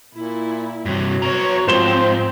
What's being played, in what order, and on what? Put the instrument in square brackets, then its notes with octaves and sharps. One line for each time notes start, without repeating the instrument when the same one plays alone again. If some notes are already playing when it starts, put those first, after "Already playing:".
[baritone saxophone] A#2 [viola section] E4
[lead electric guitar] G2 C3 [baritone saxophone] F#3
[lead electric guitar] B3 A#5 [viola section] C#5
[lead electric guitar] G#2 [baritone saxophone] F3 [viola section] C4 [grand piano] C5 E7 G7